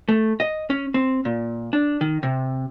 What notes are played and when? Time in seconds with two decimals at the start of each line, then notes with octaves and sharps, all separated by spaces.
0.08 A3
0.40 D#5
0.70 C#4
0.94 C4
1.25 A#2
1.73 D4
2.01 D#3
2.23 C3